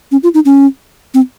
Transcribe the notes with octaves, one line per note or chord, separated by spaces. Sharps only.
C#4
F4
D#4
C#4
C4